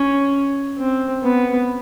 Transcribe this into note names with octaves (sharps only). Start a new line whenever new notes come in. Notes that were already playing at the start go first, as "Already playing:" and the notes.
Already playing: C#4
C4
B3